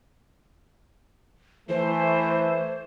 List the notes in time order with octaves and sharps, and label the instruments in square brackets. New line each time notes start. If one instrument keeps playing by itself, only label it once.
[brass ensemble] E3 A3 [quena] C5